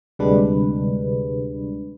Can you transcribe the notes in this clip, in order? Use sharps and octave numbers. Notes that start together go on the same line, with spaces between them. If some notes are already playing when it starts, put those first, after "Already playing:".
D2 C3 G3 G#3 D4 B4